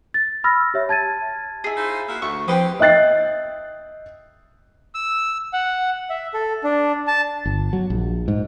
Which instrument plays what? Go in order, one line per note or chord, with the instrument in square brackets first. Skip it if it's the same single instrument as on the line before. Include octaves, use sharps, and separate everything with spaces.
[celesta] A6
B5 E6 F6 A#6
G4 C#5 E5
A5 G#6 A6 D#7
[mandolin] E4 G#4
[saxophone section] D#4 F4 C5
A#3 F#4 E5
[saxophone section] D2 [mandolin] C#6
[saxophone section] E3 C4 G4 [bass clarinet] F3 [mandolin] G5 C6 D#6
[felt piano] D#5 E5 G5 F#6 A6 C7
[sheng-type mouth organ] E6
F#5
E5
A4
D4
A5
[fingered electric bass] G1
F#3
A#1
G#2